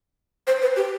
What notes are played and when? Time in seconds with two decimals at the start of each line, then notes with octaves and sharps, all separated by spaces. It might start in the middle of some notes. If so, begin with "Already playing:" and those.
0.47 C5
0.62 B4
0.76 G4